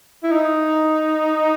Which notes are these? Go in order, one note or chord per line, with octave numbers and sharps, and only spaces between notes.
E4
D#4